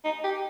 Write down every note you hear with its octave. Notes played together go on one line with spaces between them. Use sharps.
D#4
G4